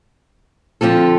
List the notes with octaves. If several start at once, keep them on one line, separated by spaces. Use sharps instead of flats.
D3 F3 C4 F4 A4